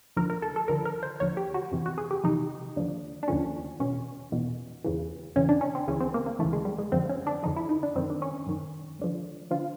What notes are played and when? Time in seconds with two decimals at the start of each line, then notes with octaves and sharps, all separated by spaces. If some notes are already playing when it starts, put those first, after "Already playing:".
0.17 D#2 D3 F3 A#4
0.30 A#4
0.42 A4
0.56 A4
0.68 D#2 D3 F3 A#4
0.85 A#4
1.03 C5
1.20 D#2 D3 F3 C#5
1.37 G4
1.54 F#4
1.72 F2 C3 E3
1.86 F#4
1.98 G#4
2.11 G4
2.24 F2 C3 E3 D#4
2.76 D#2 D3 F3
3.23 D4
3.28 D#2 D3 F3 C#4
3.80 E2 B2 C#4
4.32 E2 B2
4.84 E2 C#3 E3
5.36 E2 C#3 E3 C#4
5.49 D4
5.61 C#4
5.75 C4
5.88 D2 C#3 E3 C#4
6.00 C4
6.14 A#3
6.26 A#3
6.39 E3 A3
6.42 D2 C#3
6.53 G#3
6.65 G3
6.78 G#3
6.92 F2 D3 F3 C4
7.09 C#4
7.27 D4
7.43 F2 D3 F3 D#4
7.56 E4
7.69 D#4
7.83 D4
7.95 F#2 D#3 C4
8.10 D4
8.22 C#4
8.47 F#2 D#3
8.99 D#2 D3 F3
9.51 D3 F3 F4